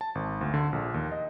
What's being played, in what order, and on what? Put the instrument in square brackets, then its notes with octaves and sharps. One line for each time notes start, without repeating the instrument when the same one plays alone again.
[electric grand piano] A5
G#1
D2
D3
A#1
D#2
D#5